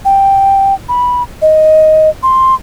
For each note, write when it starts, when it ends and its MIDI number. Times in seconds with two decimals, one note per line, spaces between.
0.05 0.74 79
0.89 1.23 83
1.42 2.09 75
2.23 2.55 84